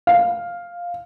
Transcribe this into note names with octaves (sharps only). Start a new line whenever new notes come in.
F5